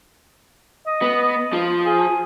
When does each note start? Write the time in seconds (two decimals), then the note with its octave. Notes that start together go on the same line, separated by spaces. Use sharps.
0.86 D#5
1.02 B3
1.53 F3
1.86 G#4